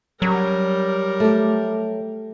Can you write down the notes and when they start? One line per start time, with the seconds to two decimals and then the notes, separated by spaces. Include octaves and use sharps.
0.22 F#3 G3 C#4 A#4
1.20 A3 G4